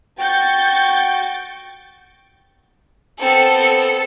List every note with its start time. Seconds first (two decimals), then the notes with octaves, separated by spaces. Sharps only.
0.19 F#4 G5 C#6 G6 A6
3.20 B3 C4 A4